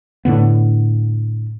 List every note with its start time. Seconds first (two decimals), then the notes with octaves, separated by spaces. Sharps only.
0.25 A2 D3 B3